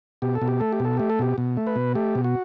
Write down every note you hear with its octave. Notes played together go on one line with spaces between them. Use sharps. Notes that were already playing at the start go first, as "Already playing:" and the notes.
B2 G4
A4
B2
G4
A3 A4
G4
B2 A4
A3 G4
A4
B2 G4
B2
A3
B4
B2
A3 G4
B2
F#4